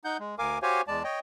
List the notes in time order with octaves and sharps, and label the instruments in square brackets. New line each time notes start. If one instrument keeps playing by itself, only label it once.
[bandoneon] D#4 F#5 G6
G#3
D2 A#4 F5 G#5 D6
F#4 G4 C5 C#5 F5 G#5
E2 G#3 D5 A5
C#5 D#5 G5